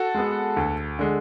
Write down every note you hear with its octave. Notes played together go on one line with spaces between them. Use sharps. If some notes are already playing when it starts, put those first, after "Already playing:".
Already playing: F#4 A4
G#3 B3
D2
D3 G#3